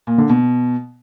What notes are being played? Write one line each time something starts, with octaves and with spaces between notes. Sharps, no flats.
A#2
D3
B2